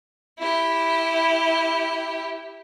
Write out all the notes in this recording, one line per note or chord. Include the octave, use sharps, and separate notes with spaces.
E4 G4